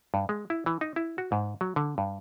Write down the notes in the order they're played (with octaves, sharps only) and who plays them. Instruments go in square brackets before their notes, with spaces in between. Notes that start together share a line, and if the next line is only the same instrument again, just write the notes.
[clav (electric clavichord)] G2
G#3
E4
E3
D#4
E4
F#4
G#2
F#3
D3
G2